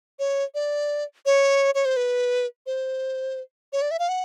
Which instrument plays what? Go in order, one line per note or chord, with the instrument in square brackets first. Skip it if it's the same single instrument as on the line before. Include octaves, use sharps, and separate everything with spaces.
[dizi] C#5
D5
C#5
C#5
C5
B4
C5
C#5
D5
E5
F5
F#5